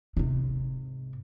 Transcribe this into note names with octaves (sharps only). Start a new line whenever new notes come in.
G#2 C3